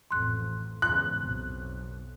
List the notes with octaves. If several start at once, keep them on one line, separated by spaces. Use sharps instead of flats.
A1 F2 C6 F#6
E2 G#2 C#3 C6 F#6
B1 F2